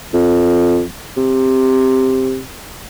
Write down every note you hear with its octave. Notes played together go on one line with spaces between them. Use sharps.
F2
C3